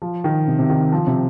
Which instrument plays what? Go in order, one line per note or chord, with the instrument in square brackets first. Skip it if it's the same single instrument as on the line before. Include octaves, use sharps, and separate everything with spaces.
[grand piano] F3
D#3
C3
C3
D#3
F3
C3